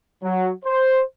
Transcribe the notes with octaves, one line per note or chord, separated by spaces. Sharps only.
F#3
C5